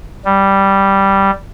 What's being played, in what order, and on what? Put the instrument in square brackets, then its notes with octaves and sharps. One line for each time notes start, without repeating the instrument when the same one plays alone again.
[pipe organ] G3